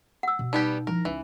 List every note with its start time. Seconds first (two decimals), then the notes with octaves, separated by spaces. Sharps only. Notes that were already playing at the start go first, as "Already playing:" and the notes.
0.23 F#5 E6
0.39 B2
0.53 G3 B3 D#4 G4
0.87 F3 E4 A#4
1.05 C#2 E3